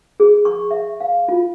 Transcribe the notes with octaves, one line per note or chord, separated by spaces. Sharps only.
G#4
C#6
E5
F5
F4